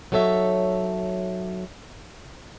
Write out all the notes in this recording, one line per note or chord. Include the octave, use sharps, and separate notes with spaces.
F#3 D#4 A4 C#5 E5